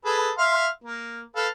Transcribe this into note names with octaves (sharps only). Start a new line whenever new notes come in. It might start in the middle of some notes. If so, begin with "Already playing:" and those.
G#4 A4 B4
E5 F5 C6
A#3
A4 B4 F5